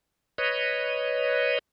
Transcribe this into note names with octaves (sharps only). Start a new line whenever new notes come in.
B4 C#5 D#5